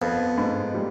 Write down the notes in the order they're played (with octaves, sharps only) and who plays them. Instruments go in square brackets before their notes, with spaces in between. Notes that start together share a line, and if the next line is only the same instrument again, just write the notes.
[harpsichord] F2 [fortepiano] B3
[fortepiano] G#2
G3